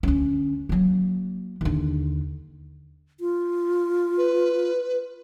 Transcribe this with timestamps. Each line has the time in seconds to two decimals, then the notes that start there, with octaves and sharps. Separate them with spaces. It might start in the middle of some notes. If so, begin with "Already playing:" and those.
0.03 D2 C#4
0.69 F#3 A#3
1.61 D#2 D3
3.20 F4
4.18 B4